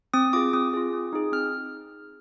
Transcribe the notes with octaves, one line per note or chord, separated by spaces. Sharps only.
C4 D#6
F4 G#4 D6
C4 D#6
F4 G#4
C4
D#4 G#4
C4 F6